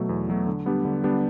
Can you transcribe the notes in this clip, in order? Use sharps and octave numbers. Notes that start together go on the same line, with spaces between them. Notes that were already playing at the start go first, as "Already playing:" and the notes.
Already playing: B2 F#3 A3
E2
B2 F#3 A3
D3
G3 B3 D4 G4
D3
G3 B3 D4 G4